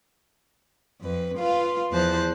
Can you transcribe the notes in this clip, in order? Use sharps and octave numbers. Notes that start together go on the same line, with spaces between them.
F2 B4
F4 B4 F5
E2 E3 F3 C5 A5 F#6